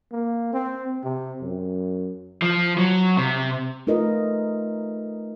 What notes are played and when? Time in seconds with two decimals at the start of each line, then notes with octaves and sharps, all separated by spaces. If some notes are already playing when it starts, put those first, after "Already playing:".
0.12 A#3
0.53 C4
1.04 C3
1.41 F#2
2.42 F3
2.78 F#3
3.17 C3
3.87 A3 D#4 F4 A#4 B4 D#5